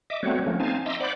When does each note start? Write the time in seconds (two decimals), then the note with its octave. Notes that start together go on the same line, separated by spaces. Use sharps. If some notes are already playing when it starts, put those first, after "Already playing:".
0.10 D#5 E5 D6
0.23 G3 A3 B3 C4 F#4 C#5
0.47 F3 A3 A#3 C#4
0.60 C4 D#4 F5 G#5 A5
0.86 D#5 E5 A#5 C6 D6 E6
1.00 C5 D5 F#5 B5 D6